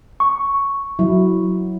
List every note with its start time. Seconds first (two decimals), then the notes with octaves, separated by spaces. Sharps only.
0.20 C#6
0.99 F#3 E4